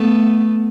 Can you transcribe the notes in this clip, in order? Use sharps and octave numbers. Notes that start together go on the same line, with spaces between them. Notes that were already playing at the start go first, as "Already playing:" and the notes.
Already playing: A3 B3